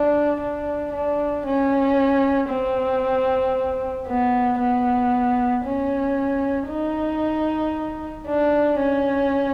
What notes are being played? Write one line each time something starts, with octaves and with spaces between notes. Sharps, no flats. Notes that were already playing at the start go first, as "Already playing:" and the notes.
Already playing: D4
D4
D4
C#4
C4
B3
B3
C#4
D#4
D4
C#4